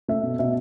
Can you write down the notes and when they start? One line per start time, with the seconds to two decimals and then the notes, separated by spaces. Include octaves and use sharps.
0.08 A3 E5
0.23 B2
0.39 B2 E5